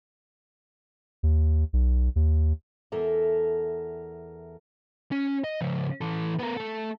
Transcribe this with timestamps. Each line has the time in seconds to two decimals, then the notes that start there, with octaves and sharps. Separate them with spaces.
1.23 D#2
1.73 B1
2.16 D#2
2.92 E2 A4 A#4 E5
5.12 C#4
5.44 D#5
5.61 C#3 F3
6.01 E3 A4
6.39 B3 A#4
6.57 A3 A4